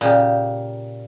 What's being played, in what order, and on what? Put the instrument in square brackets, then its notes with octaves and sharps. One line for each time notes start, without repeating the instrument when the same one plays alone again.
[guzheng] A#2 C#3 G4